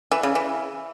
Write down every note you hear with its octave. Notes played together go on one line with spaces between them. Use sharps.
E3
C#3
E3